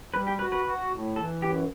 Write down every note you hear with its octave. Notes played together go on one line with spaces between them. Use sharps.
G3 B4
G4
F#4 B4
B4
F#4
A2
E3 A4
F#2 G4